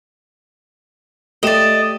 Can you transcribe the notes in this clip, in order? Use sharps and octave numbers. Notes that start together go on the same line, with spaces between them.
A3 G4 D5 D#5 E7